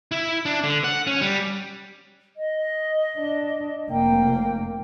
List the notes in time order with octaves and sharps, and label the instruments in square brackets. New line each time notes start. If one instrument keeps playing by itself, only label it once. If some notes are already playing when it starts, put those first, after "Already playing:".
[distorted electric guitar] E4
D4
D3
F#5
C#4
G3
[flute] D#5
[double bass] D4
[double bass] F1 A#3 [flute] G5